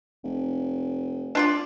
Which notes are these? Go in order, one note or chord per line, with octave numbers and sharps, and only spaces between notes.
F1
D4 F4 D5